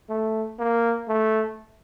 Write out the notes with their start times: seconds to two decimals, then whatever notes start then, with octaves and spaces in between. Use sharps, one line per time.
0.09 A3
0.59 A#3
1.08 A3